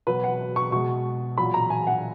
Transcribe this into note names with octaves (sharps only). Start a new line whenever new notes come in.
B2 F#3 B4
F#5
C#6
B2 G#3 C#6
A#2 F#3 B5
A#5
G#5
F#5